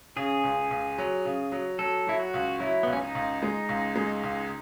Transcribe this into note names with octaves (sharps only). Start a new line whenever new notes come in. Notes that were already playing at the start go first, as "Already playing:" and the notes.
C#3 G#4
C#2
C#2
F#3
C#3
F#3
F#3 A4
F#3 E4
F#4
C#2
F#3 E4
C#2 B3
C#4
D#4
C#2
G#3 D#4
C#2
G#3
C#2